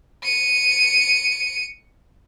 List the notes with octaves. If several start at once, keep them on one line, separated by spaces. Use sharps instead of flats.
C#7 D#7